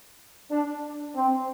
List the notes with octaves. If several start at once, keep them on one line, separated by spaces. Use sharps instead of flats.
D4
C4